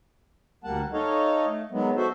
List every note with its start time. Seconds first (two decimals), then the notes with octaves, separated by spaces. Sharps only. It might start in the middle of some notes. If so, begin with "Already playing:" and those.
0.64 D2 G3 A#3 F#5 A5
0.93 D#4 A4 C#5 D#5 F5
1.46 A3
1.71 D#3 F#3 G#3 B3
1.96 F#4 A4 C5 E5